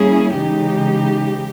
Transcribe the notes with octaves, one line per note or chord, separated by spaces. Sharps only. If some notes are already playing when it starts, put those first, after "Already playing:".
Already playing: G3 A#3 C#4 E4 G#4
C#3 E3 G#3 D#4 G4